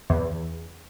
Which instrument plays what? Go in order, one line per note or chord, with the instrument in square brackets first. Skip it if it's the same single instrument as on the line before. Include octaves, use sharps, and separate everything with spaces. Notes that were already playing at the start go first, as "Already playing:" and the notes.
[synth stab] E2